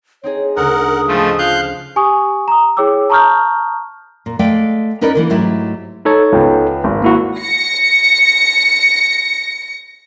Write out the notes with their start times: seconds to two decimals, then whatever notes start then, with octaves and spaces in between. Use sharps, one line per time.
0.24 C4 D#4 G#4 C#5
0.56 D2 C#3 A#4 F#5 D#6
1.08 G#2 F3 G#3 A3
1.39 F3 F5 F#6 G6
1.96 G4 G#5 C#6 D#6
2.48 A#5 D#6
2.77 E4 G#4 C#5 G5 D6 E6
3.10 A5 A#5 C#6 D#6 F6 G6
4.26 A#2
4.39 G#3 A3 D5 F5 G5
5.01 C#4 D#4 A#4 B4 D5 D#5
5.15 D3 E3 A#3
5.30 G#2 F#3 A3 E4 G4
6.05 D#4 A4 C#5
6.32 C#2 B3 G5
6.84 G#1
7.02 A#3 E4 F#4
7.41 A#6 C#7